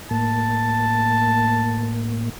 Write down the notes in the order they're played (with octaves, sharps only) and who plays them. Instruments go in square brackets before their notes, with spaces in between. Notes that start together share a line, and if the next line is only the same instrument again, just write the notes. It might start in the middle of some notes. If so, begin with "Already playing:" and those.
[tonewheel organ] A2 A#3 [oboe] A5